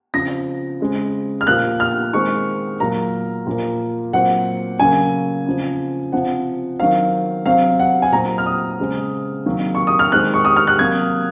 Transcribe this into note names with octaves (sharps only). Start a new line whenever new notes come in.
C#3 F3 C4 A#6
C#3 G#3 C4
F6
A#2 F3 A#3 F#6
F6
D#3 G#3 C4 C#6
A#2 F#3 A#3 A#5
A#2 F3 A#3
A#2 F#3 C4 F#5
C#3 F#3 A#3 G#5
C#3 F3 C4
C3 F3 C4 F#5
D#3 F#3 C4 F5
C3 F#3 C4 F5
F#5
G#5
A#2 F#3 C4 A#5
F6
D#6
C#3 G#3 C4
C3 D#3 F#3 A#3
C#6
D#6
F6
D#3 G#3 C4 F#6
C#6
D#6
F6
F#6
C3 F#3 A#3 G#6